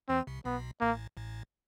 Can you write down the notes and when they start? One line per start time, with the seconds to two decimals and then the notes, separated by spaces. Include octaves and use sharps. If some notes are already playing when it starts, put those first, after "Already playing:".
0.09 E2 E3 C4
0.27 C2 C3
0.45 B1 B2 B3
0.81 A1 A2 A#3
1.17 A1 A2